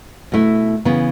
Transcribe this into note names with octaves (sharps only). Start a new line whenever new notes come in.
B2 A3 E4
C#3 E3 B3